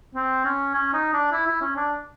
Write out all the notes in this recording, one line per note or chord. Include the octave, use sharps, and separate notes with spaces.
C4
C#4
C#4
D#4
D4
E4
E4
C#4
D4